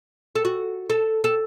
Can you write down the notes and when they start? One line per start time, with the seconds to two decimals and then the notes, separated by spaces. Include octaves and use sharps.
0.35 A4
0.45 F#4
0.90 A4
1.24 A4